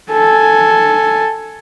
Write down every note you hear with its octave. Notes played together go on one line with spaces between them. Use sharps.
A4 G#5